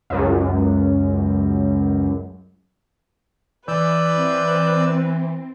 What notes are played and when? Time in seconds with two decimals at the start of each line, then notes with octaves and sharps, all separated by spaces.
0.10 C#2 F#2
3.68 E3 B4 D5 E6 G6
4.14 C4